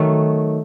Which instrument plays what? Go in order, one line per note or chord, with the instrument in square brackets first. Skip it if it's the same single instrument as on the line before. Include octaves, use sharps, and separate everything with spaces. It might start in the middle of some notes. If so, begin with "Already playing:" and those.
Already playing: [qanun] D#3 F#3 A3